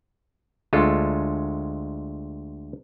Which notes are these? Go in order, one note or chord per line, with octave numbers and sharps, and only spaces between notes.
D2 G#3 F4 A4 A5